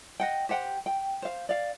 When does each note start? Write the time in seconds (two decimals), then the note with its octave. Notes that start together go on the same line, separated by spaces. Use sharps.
0.20 D#5 F#5 G5
0.49 G4 C5 F#5 G5
0.86 G5
1.22 C5 F5
1.49 D5 F5